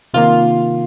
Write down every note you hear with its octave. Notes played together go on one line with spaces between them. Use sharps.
C3 D#3 A#3 F4